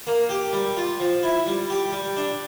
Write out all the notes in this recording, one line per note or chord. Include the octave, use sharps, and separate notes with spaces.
A#3
G4
G3
F4
F3
E4
G3
G4
G3
D4